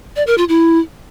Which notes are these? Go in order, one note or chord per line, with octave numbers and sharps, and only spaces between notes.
D5
A#4
F4
E4